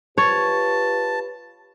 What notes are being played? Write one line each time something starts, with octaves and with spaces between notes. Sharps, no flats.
F4 G4 B4 C#5 A5